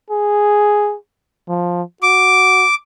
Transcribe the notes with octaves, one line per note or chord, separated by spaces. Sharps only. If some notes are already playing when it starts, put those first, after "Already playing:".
G#4
F3
F#4 D6